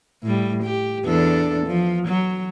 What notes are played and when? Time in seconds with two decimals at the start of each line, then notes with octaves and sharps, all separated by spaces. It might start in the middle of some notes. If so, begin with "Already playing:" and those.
0.23 A2 G3
0.63 G4
1.05 E2 D4 A4
1.66 F3
2.07 F#3